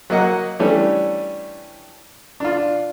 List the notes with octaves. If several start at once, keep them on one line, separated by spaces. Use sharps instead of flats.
F#3 A#3 D#5 F#5
E3 G3 A3 C#4 D4
D4 F4